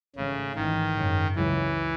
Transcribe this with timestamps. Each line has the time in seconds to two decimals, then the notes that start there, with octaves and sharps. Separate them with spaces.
0.16 G#1 G#2 C#3 E3 A3 C#4
0.55 G#1 G#2 D#3 E3
0.96 G#1 F#2 C#3
1.35 C#2 C#3 E3 F#3